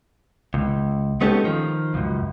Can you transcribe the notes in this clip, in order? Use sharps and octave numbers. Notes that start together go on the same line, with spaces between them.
C#2
G#3 B3 C#4 D#4 G4 A4
D#3 F3
C#2 F#2